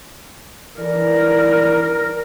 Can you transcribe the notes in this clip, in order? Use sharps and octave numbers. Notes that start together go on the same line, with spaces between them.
E3 A#4 D5